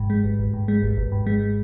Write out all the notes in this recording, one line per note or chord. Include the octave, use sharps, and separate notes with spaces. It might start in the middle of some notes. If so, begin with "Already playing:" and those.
Already playing: G#1 G#2
G#3
G#1
G#1
G#2
G#3
G#1
G#1
G#2
G#3